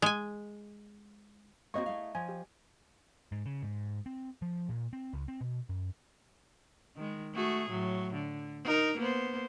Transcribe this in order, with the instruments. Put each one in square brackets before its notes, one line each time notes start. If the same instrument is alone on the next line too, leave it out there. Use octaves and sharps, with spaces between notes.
[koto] G#3 G#5
[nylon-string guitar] A#3 C4 F#4 [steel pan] D#5 C#6
[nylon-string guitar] A3 E4 F5
[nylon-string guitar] F3 [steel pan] G#5
[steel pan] G4
[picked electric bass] G#2
C#3
G#2
C4
F3
A#2
C4
C#2
C4
B2
F#2
[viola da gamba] D#3 G#3
A3 F#4 G#4
A2 F#3
D3
D#4 A#4
A#3 B3 C5